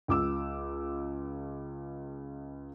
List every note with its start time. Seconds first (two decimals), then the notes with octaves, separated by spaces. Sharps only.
0.08 C#2 D6 E6